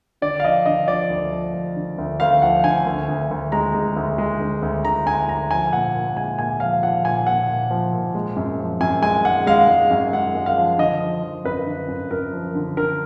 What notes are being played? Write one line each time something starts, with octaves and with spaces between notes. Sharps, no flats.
D3 D5
F5
F3 D#5
D3 D#5
F3 D5
D2
F3
F3
D3
D2
D2 F5
F3 F#5
D3 G#5
D2
D2
D2
G#3 A#5
G#3
D2
G#3
D2
D2
D2 A#5
D2 G#5
D2 A#5
F3 G#5
A#2 F#5
A#2
G#3 G#5
A#2 G#5
F3 F5
F3 F#5
A#2 G#5
A#2 F#5
A#2
F3
A#2
G#3
F#2
F3
F#2 G#5
G#3 G#5
G#3 F#5
G#3 F5
G#3
F#2
G#3 F#5
G#3
F5
F3
D3 D#5
F3
F3
F#2 B4
D3
F#2
F#2 A#4
F3
D3
D3 A#4